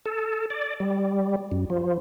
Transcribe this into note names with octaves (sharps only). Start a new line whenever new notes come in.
A4
D5
G3
F#2
F3